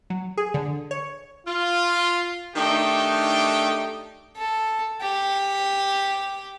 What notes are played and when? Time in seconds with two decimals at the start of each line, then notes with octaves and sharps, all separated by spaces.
0.10 F#3
0.37 G#4
0.54 D3
0.91 C#5
1.47 F4
2.55 D#3 A3 D4 D#4 G4 G5
4.36 A4
5.01 G4